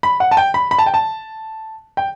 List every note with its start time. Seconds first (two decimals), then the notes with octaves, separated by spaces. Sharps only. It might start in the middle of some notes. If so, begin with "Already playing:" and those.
0.03 B5
0.20 F#5
0.31 A5
0.37 G5
0.54 B5
0.71 B5
0.78 A5
0.86 G5
0.94 A5
1.97 G5